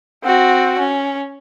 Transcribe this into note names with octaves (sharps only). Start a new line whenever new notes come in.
C4 F#4
C#4